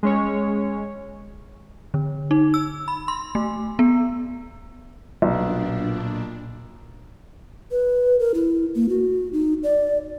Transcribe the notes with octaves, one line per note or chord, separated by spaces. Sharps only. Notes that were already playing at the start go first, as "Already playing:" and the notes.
G#3 C#4 C#5
D3
D#4
E6
B5
C6
A3
B3
B1 A#2 D4
B4
A#4
E4
A#3
F#4
D#4
D5